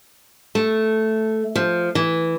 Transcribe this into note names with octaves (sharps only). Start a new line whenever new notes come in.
A3
F3
E3